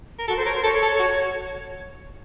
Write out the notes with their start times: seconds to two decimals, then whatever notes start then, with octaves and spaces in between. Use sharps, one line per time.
0.19 A#4
0.28 F#4 A4
0.37 C5
0.45 A#4 C#5
0.55 C5
0.63 A4 C#5
0.82 A4
0.99 F#4